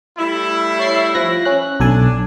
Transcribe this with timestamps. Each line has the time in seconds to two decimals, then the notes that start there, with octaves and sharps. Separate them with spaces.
0.18 G3 A3 E4
0.79 C#5 A6 C7
1.15 F3 F#6 A#6
1.45 C#4 F#6
1.80 B1 D4 A4 G#5